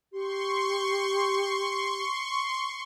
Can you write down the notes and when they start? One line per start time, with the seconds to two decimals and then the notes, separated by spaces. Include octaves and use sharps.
0.13 G4 C6 C#6